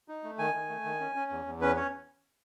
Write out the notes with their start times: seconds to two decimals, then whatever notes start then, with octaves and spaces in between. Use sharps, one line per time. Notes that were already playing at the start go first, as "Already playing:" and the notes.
0.08 D#4
0.24 A3
0.39 D#3 G#5
0.54 D#3
0.69 A3
0.84 D#3
1.00 C#4
1.16 C#4
1.31 E2
1.46 E2
1.61 C#4 B4
1.76 C#4 C#5